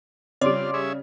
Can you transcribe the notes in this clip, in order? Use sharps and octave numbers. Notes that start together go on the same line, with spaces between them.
C#3 G3 C4 F4 C#5 D5 C6 D6
C#4 G#4 E5